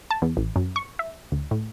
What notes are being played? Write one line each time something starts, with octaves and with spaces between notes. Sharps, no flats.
A5
E2
A1
F#2
C#6
E5
D2
A2